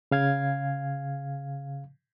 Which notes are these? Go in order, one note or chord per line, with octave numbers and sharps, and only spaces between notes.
C#3 F5 G#6